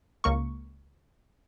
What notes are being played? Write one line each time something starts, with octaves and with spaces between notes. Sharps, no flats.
C#2 A#3 C#6